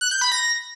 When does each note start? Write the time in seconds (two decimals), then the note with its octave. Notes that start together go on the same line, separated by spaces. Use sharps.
0.01 F#6
0.11 G6
0.21 B5
0.32 A#6